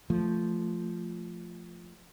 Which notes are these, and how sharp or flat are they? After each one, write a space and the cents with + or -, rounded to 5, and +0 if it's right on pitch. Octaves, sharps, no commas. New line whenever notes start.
F3 -5 A3 +0